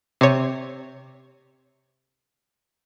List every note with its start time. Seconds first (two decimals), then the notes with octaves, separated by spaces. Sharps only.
0.21 C3 C#5